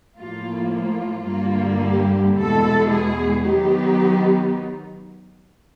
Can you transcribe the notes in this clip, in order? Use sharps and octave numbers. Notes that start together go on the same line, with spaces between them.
A2 F3 A#3 F4
F4
G2 D3 G3 A#3
G4
E2 B2 G#3 A4
G#4
D#3 F#3 B3 D#4 G4